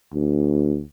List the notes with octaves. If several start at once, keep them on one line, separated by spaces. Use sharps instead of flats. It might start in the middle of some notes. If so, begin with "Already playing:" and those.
D2